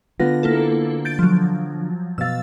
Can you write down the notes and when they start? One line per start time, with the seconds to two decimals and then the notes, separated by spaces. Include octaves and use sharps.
0.20 D3 B3 F4 A#6
0.43 A#3 E4 A4
1.05 G6 A6 D7
1.19 F3 F#3
2.18 B2 F5 E6 A6